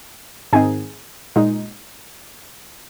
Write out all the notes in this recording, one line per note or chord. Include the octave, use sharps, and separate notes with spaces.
G#2 D#3 C4 D#4 G#4 G#5
A#2 G#3 D#4